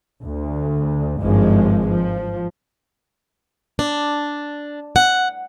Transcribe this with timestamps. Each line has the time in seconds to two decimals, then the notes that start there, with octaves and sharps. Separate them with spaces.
0.23 D2
1.20 G#1 G2 F3 G#3
1.87 F3
3.79 D4
4.96 F#5